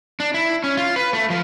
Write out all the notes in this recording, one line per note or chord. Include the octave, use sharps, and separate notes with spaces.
D4
E4
C#4
F4
B4
A3
F3